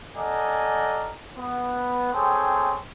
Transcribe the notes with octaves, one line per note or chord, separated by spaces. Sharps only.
A4 A#4 D5 D#5 F#5 G#5
B3
C4 G#4 A4 C#5 G5 C6